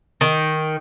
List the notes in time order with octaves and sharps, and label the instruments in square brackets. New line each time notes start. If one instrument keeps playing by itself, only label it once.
[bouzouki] D#3